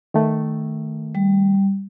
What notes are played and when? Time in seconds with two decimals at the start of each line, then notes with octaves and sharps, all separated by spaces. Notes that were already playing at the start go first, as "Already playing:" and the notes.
0.14 D#3 A3
1.15 G3